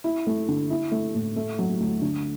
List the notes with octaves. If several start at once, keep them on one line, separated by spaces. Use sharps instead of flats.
E4
A3
D3
E4
A3
A2
A3
F#3
D2
D3